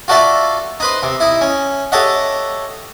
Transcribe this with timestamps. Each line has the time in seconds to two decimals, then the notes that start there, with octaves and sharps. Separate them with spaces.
0.08 F4 F#4 A4 D5 E5
0.80 D#4 B4 C5
1.03 C3
1.20 D#4 E4
1.41 C#4
1.92 G4 A4 C#5 D#5 E5 F#5